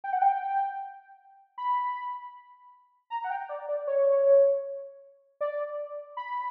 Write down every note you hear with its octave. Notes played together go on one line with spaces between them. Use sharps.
G5
F#5
G5
B5
A#5
F#5
G5
D5
D5
C#5
D5
B5